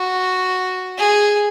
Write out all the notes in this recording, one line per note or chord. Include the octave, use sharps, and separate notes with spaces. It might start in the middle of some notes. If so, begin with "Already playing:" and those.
Already playing: F#4
G#4